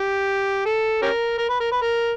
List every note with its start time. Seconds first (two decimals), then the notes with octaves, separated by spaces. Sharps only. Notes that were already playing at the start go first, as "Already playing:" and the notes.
Already playing: G4
0.66 A4
1.02 C#4 G4 A#4
1.38 A#4
1.49 B4
1.60 A#4
1.71 B4
1.82 A#4